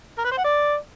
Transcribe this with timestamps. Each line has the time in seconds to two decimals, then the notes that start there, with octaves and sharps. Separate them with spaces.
0.18 A#4
0.25 B4
0.31 C5
0.38 F#5
0.44 D5